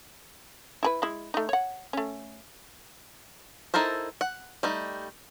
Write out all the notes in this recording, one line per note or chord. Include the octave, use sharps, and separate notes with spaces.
E4 G#4 B4
G#3 E4
A3 D#4
C#5 F#5
A3 C#4
D#4 E4 A4 A#4 C5
F#5
G3 A3 D#4